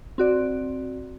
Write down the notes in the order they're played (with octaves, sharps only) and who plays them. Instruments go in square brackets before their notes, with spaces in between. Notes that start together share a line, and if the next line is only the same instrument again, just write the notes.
[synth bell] C4 F#4 D5